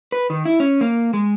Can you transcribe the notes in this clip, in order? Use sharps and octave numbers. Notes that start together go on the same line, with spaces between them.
B4
D#3
E4
C#4
A#3
G#3